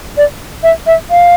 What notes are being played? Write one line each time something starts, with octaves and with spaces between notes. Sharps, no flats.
D5
E5
E5
F5